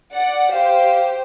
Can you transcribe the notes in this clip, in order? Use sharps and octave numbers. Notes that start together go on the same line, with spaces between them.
D5 F#5
G4 C5 F5